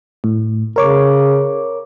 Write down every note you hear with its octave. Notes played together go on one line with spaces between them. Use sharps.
A2
C#3 A#4 C#5 D6